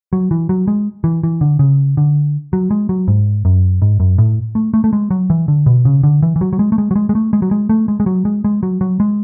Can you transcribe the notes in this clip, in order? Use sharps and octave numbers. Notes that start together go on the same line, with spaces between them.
F#3
E3
F#3
G#3
E3
E3
D3
C#3
D3
F#3
G#3
F#3
G#2
F#2
G#2
F#2
A2
A3
A3
A3
G#3
F#3
E3
D3
B2
C#3
D3
E3
E3
F#3
F#3
G#3
A3
G#3
F#3
G#3
G#3
A3
G#3
F#3
G#3
A3
G#3
G#3
F#3
G#3
G#3
F#3
F#3
G#3